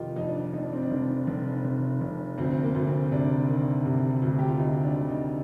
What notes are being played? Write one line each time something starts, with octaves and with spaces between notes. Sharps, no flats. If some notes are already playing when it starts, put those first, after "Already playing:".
Already playing: F1 D#3 D#4 F4 G4
F2 D#4
D4
D#4
F2 D#4
D4
C4
D4
F1
F1
F1
F1
D2 C4
A#3
D2
C4
C3 D4
D#3
C3
D2
G4
F4
D2 D#4
D4
D2
D#4